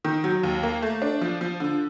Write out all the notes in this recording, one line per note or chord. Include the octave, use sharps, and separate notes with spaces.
D#3
F#3
D#2
A#3
A3
D4
F3
F3
D3